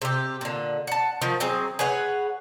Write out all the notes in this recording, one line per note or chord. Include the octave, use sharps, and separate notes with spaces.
C3 G4
A#2 D3
F#5 A5
D#3 F3
F#3 C4 G#4
G#4 B4 C#5 F#5